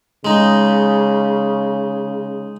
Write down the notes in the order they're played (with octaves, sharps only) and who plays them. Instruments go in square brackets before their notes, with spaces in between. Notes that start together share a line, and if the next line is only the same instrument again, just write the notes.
[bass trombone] C#3 [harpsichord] G#3 D#4